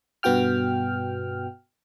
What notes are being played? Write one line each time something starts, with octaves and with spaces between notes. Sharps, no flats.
G2 B2 B3 F#4 G5 F6